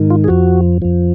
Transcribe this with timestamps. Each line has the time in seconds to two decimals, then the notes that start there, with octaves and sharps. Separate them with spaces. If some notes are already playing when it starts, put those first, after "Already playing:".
Already playing: G#2 D#3
0.10 F4
0.24 G#4
0.28 F2 F3 F#4
0.82 F2 F3